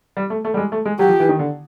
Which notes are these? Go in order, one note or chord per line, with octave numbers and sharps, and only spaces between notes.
G3
A3
A3
G3
G#3
A3
G#3
F#3 G4
F3
E3
D#3
D3